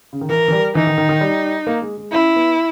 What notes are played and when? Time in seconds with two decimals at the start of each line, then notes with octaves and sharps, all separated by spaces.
0.13 C#3
0.21 D#3
0.29 E3 A#4
0.48 E3
0.52 G3
0.75 E3 D#4
0.87 D#3
0.98 D#3
1.09 D#3
1.21 G3
1.67 A#3
1.82 G#3
1.98 G#3
2.12 C#4 E4
2.36 B3